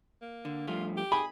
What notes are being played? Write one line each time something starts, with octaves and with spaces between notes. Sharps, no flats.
A#3
D3
G2 F3 A3 F4
G4
G#4 B5